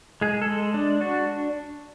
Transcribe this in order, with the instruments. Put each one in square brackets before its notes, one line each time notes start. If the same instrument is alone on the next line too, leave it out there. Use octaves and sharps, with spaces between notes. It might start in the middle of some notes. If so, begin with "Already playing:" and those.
[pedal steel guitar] G#3 G#4
A4
G#3
D4
D4 F#4